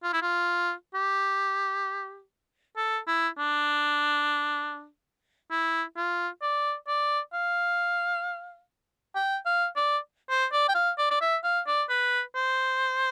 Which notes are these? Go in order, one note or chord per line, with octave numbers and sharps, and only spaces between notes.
F4
E4
F4
G4
A4
E4
D4
E4
F4
D5
D5
F5
G5
F5
D5
C5
D5
G5
F5
D5
D5
E5
F5
D5
B4
C5